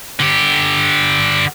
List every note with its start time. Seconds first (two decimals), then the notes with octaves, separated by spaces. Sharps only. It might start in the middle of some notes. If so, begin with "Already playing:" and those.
0.20 D3 G4